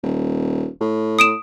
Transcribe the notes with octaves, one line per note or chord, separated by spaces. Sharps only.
D#1
A2
D#6 D7 E7